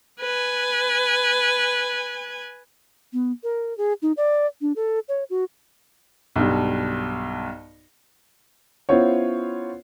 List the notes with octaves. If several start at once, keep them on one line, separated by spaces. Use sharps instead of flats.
B4 G#5
B3
A#4
G#4
D#4
D5
D4
A4
C#5
F#4
B1 G2
B3 C#4 E4 F4 C5 C#5